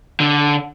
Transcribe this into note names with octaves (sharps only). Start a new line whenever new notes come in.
D3